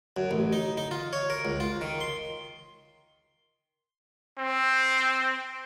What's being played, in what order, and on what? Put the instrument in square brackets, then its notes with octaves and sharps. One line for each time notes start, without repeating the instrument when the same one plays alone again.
[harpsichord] F#2
A1
D#4
D#4
F4
C#5
A#4
C#2
F4
D#3
C6
[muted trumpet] C4